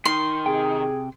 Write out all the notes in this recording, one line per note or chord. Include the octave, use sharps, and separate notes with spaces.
D#3 C6
C3 G#4 G5